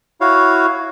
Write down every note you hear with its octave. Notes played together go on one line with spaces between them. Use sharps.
E4 F#4 C#5 F5